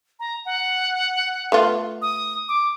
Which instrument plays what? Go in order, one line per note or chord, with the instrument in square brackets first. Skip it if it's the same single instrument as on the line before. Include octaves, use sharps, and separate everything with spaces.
[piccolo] A#5
F#5
[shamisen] A3 B3 F4
[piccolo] D#6
D6